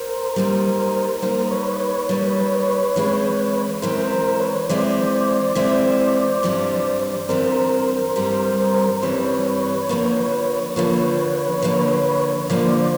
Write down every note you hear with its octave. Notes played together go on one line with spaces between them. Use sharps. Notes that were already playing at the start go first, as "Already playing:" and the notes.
Already playing: A#4 C5
G3 A#3 D#4
G3 A#3 D#4 A#4 C5
B4 C#5
B4 C#5
G3 A#3 D#4
E3 G#3 C4 E4
E3 G#3 C4 E4 A#4 C5
A#4 C5
B4 C#5
E3 G#3 C4 E4 C5 D5
E3 G#3 C4 E4
G2 E3 G3 C4
G2 E3 G3 C4 A#4 C5
G2 E3 G3 C4
G2 E3 G3 C4 B4 C#5
D3 F3 A#3
D3 F3 A#3 B4 C#5
D3 F3 A#3
D3 F3 A#3 C5 D5